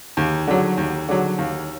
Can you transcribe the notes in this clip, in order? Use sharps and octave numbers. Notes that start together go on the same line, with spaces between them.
D#2
D3 F#3
D#2
D3 F#3
D#2